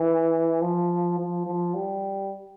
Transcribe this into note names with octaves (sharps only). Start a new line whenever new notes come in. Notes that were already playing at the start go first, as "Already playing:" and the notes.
Already playing: E3
F3
F3
F3
G3